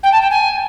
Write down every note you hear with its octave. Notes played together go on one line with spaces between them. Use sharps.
G5
A5
G5
G#5